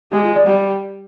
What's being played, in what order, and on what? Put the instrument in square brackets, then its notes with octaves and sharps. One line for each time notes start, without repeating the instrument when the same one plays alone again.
[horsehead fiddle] G#3 [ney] G4
[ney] F4
D5
[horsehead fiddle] G3